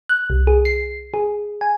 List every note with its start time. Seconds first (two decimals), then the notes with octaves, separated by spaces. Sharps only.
0.09 F#6
0.30 C2
0.47 G#4
0.65 C7
1.14 G#4
1.61 G#5